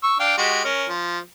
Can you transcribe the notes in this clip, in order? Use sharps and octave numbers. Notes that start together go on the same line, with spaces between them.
C#6 E6
D4 F5 G5
G#3 F#4 G4
C#4 A#4
F3